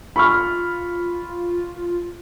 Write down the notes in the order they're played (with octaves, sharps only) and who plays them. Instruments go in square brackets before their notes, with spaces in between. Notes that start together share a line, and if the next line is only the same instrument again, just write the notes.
[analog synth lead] F4 [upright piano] B5 C#6 F6